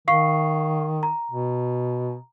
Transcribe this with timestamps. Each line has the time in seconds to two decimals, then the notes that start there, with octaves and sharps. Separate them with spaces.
0.08 D#3 F5 C#6 C7
1.03 A#5
1.31 B2